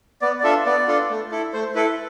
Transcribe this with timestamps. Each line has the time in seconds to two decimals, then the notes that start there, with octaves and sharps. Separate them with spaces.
0.21 B3 D5
0.40 D5
0.44 D4 F4 A4 E5
0.66 B3 D5
0.88 D4 F4 A4
1.10 A3
1.32 E4 A4
1.53 A3 C5
1.75 E4 A4 B4